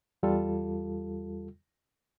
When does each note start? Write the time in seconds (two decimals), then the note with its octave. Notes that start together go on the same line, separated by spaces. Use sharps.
0.23 E2 G3 F4 A4